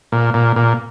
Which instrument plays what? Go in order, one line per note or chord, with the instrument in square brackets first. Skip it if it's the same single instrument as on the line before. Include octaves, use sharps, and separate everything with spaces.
[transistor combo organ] A#2
A#2
A#2